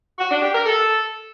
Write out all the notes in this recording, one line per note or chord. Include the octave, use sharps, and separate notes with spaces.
F#4
D4
G4
A#4
A4